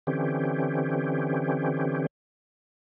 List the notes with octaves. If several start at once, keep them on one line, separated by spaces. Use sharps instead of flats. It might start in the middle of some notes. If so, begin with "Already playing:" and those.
D3 E3 C4 C#4 G4